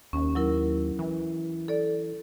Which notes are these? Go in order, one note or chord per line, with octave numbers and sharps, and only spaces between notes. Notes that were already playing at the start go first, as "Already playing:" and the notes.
D#2 C#4
F#3 E4 A#4
E3
A4 D5